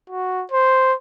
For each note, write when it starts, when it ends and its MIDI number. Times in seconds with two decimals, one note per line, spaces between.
0.10 0.44 66
0.52 0.94 72